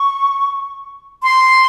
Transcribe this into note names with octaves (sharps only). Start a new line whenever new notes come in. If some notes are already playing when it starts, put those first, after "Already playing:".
Already playing: C#6
C6